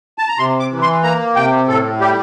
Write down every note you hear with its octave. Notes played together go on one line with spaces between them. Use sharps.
A5
A#5
C3 C6
D6
E3
C6
A#3 A#5
C3 G5
A2 A4
G3 G4